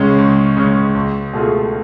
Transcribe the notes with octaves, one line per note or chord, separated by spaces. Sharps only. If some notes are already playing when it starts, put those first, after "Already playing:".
Already playing: C#2 C#3 G#3 C#4
C#2
C#3 G#3 C#4
C#2
B2 A3 F4 G#4